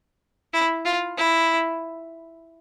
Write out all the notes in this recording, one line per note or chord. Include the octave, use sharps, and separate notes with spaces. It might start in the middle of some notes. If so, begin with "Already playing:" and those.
E4
F4
E4